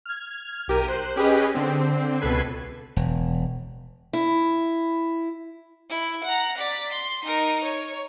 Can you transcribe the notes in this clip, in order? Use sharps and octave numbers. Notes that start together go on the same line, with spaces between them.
F6 G#6
B1 G4 A#4 D#7
C5 F#6
C#4 G4 G#4 B4 D#5
D3 C4
C#2 B2 A4 B4 G#6 C7
E1
E4
E4
F#5 A#5
D5 B6
C6
D#4 A#4
C#5